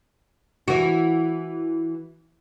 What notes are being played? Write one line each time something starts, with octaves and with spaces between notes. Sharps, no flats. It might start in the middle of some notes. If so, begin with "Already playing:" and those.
E3 F#4